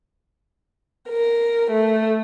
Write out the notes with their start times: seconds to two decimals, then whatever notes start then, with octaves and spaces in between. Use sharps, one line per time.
1.09 A#4
1.69 A3